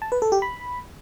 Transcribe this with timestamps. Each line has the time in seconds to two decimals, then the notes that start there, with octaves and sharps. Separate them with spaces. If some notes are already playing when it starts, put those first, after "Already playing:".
0.02 A5
0.12 B4
0.22 A4
0.32 G4
0.42 B5